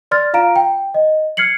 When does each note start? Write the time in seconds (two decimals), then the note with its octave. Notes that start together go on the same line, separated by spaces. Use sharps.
0.11 D5 C6 F6 A6
0.34 F4 F5 A#5 D7
0.56 G5
0.94 D#5
1.37 F6 G#6 C7 C#7 F#7